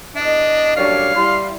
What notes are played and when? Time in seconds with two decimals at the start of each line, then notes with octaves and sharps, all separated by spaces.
0.16 E2 D4 D#5
0.76 F#2 A2 G3 D4 C#5 F5
1.16 G3 E4 C6